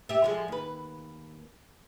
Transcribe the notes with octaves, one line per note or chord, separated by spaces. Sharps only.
G4 E5
D3 F3 G#3
D#2 B4